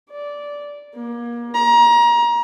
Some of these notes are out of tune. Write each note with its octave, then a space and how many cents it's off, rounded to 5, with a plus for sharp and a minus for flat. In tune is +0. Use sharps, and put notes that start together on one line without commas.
D5 -10
A#3 +30
A#5 +30